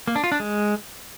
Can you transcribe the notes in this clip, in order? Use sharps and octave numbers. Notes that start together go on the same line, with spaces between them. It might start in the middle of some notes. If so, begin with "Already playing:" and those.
A#3
D4
F4
D4
G#3